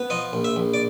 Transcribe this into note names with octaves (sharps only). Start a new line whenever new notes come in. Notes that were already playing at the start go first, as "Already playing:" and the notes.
Already playing: B3
F3 D#5
A#1
E5
A#1
D5